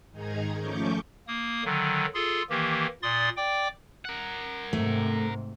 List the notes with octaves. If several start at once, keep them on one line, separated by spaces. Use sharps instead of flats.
G#2 D#3 D#4 G#4 A#5 G#6
F3 A3 C#4 C#6 D6 G6
A#3 D#6
D3 D#3 F#3
F4 G#4 A4 C6
D#3 E3 A#3 G4
A#2 D5 C6 D#6 A6
D5 G5 D6
A#4 F#5
G#2 C3 A3